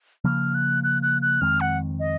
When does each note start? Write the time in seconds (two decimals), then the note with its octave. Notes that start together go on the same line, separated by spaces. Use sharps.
0.24 C#3 F3 A#3 F6
0.55 F#6
0.84 F#6
1.03 F#6
1.22 F#6
1.41 F2 D#3 G#3 C4 F6
1.61 F#5
1.99 D#5